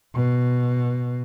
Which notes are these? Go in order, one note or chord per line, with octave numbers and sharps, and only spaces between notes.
B2